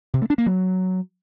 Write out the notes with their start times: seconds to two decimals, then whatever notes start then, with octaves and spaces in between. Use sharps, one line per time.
0.14 C3
0.22 A3
0.30 D4
0.38 A#3
0.46 F#3